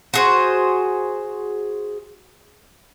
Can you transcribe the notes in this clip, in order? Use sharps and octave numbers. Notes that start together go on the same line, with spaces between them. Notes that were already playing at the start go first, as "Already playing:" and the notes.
F#4 G#4 C5